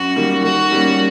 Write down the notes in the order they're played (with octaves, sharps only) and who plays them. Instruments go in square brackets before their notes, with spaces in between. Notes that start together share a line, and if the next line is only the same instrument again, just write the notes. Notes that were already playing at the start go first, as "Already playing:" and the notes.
Already playing: [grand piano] F#2 [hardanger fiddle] F#4
[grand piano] D#3 G3 A#3
[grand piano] D#3 [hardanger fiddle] F#4
[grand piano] G3 A#3 C#4